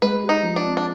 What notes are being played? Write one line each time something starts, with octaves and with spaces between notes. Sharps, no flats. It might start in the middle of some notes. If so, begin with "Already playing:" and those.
G#3 B4
G4
D#4
F3
D4
C4
D4